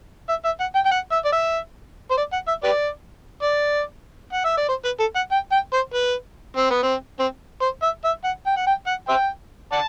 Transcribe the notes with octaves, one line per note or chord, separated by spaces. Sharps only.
E5
E5
F#5
G5
G5
F#5
E5
D5
E5
C5
D5
F#5
E5
G4 B4 D5
D5
F#5
E5
D5
C5
B4
A4
F#5
G5
G5
C5
B4
C4
B3
C4
C4
C5
E5
E5
F#5
G5
F#5
G5
F#5
C5 E5 G5
D5 F#5 A5